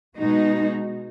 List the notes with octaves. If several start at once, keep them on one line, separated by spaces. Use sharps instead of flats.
B2 G#3 D#4 F#4